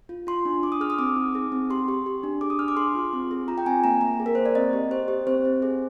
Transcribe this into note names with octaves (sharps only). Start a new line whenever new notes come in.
F4
F4 C6
D4
D4 D6
D#6
G#4 F6
D#6
C4 D6
D#4
G#4
C4
G4 C6
G4
G4
D4
G#4 D6
D#6
D4 F6
D6
G#4 C6
F4
C4
G#4
F4 A#5
G5
C4 G#5
A#3 A#5
A#3 A#5
G#4
A#4
A#3 C5
D5
C4 D#5
G4
G4 C5
G4
C4 C5
C4
G#4